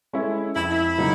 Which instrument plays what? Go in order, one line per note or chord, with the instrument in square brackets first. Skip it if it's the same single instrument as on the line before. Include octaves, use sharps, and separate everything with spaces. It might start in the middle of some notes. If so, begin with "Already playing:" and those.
[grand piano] G#3 C#4 E4 A4
[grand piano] F2 [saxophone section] E4
[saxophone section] E4
[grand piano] C#3 F#3 A#3 D#4